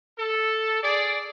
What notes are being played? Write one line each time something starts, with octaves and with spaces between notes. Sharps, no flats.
A4
G#4 D5